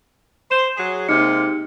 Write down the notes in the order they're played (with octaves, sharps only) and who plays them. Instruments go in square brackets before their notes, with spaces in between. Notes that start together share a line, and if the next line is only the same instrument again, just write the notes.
[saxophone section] C5 [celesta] E7
[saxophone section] F#3 G#4
[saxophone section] C3 G#3 A#3 [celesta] D#4 C#7